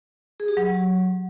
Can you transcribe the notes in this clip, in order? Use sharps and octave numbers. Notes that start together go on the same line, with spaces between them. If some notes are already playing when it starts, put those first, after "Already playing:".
G#4
G4
F#3